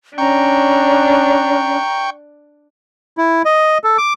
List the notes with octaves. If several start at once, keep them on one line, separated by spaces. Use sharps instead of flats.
C#4 D4 G5 A#5 C#6
E4
D#5
A4
D6